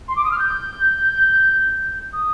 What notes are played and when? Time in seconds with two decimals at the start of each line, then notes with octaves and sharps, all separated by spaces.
0.08 C6
0.16 D6
0.24 D#6
0.31 F6
0.39 G6
2.13 D#6